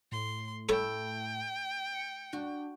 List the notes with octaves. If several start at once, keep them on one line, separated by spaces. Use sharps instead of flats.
A2 C6
A3 E4 A4 C#5 G5
C#7
D4 F#4